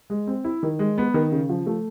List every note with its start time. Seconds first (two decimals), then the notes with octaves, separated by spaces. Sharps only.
0.10 G#3
0.27 C4
0.44 E4
0.63 D#3
0.79 G#3
0.98 B3
1.14 D#3
1.32 C#3
1.49 F3
1.66 A3